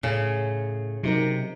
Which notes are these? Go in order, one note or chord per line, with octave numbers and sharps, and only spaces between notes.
A2 C#3
C3 F#3 D#4 A#4